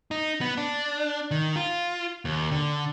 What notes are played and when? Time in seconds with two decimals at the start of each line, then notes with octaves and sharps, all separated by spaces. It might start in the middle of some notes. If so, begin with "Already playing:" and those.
0.11 D#4
0.41 B3
0.57 D4
1.31 D#3
1.56 F4
2.25 D#2
2.51 D3